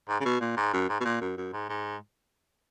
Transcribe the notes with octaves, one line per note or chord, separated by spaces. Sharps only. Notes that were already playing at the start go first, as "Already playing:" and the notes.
G#2
C#3
B2
A#2
G#2
F#2
G#2
B2
A#2
F#2
F#2
G#2
G#2